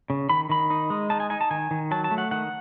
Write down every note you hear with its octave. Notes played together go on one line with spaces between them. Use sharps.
C#3
D#3 B5
D#3 B5
D#4
G#3
D#4 A5
G#5
D#4 G#5
A5
D#3 G#5
D#3
F#3 A5
A5
A3
F#5
D#3 F#5